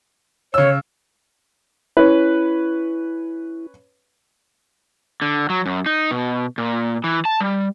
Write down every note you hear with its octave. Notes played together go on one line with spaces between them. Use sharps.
C#3 C#5 E6
C#4 E4 B4
D3
F#3
F#2
D#4
B2
A#2
E3
A5
G3